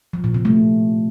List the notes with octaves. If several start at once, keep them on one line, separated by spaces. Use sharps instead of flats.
F3
A#2
C3
A3